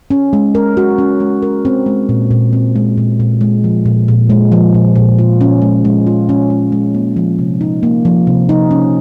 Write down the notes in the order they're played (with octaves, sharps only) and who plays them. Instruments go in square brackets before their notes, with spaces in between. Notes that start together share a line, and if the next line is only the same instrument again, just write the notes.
[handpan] C#4
G#3
A#4
F#4
C#4
G#3
A#4
C4
G#3
A#2
A#2
C4
G#3
A#2
A#2
G#3
F3
A#2
A#2
G#3
F3
A#2
A#2
F4
C#4
G#3
G#3
F4
C#4
G#3
G#3
A#3
F3
C3
D#4
A#3
F3
C3
D#4
C#4